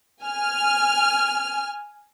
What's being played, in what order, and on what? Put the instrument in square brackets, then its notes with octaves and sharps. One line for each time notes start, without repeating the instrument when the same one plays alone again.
[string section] G#5 F6